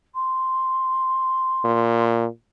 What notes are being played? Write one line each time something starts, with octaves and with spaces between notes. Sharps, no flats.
C6
A#2